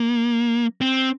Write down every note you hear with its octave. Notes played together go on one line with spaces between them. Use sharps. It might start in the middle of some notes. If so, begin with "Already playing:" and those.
Already playing: A#3
C4